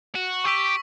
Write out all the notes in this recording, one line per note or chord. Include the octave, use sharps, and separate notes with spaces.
F#4
G4 C#6 E6 B6